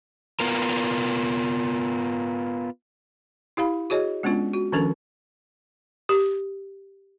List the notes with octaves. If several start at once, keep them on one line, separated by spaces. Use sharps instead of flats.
B3 F4 A#4
E4 G4 F5 B5
F#4 G#4 C#5 D#5
G#3 B3 C#4 D4 F4
F#4
D#3 F3 C#4 D4 A4 A#4
G4